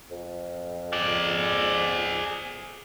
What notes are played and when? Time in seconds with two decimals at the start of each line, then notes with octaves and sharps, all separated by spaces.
0.11 F2
0.93 G#4 D5